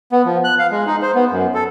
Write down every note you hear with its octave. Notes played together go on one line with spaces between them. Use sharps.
B3
F3
F#6
F5
G#3
D#4
C5
B3
F#2
A4